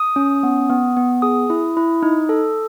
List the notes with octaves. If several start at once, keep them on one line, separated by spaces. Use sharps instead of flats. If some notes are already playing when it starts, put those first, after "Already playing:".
Already playing: D#6
C#4
B3
B3
B3
G#4 D#6
E4
E4
D#4
A4